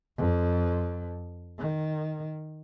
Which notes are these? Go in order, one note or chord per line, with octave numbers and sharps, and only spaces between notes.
F2
D#3